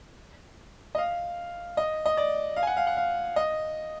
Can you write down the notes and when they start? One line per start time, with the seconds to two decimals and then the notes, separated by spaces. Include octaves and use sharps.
0.95 D#5
0.98 F5
1.77 D#5
2.06 D#5
2.17 D5
2.56 F5
2.63 G#5
2.67 F#5
2.77 F5
2.87 F#5
2.97 F5
3.36 D#5